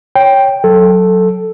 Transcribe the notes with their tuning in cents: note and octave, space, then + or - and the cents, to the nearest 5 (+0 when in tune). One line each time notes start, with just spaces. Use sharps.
C#5 +0 G5 +0
F#3 +0 A4 +0